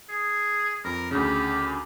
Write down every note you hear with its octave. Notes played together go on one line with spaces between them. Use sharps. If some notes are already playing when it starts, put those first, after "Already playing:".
G#4
F2 A#4
D2 C#3 G4